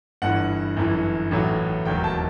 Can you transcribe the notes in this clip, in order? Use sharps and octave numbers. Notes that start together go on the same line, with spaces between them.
G1 G2 E3 F#5
G1 F#2 E3
A1 A2 F#3
E1 D#2 D#3 F#3 G5
A5